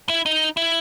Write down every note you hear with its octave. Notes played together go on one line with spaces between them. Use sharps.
E4
D#4
E4